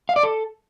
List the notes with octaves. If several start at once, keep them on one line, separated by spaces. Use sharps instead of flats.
F5
D5
A4